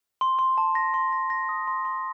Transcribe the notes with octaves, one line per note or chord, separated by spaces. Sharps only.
C6
C6
A5
A#6
C6
A#6
A#6
D#6
C6
C6